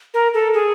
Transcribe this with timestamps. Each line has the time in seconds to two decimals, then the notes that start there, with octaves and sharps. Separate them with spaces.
0.14 A#4
0.34 A4
0.54 G#4